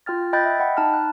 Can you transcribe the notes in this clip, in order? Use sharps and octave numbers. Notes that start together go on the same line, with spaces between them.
F4 G5 F6 A6
D#5 G5 B5 F#6 G6 A6
E5
D#5 F#5 G5 B5
D#4 A5 B5 F6
F#6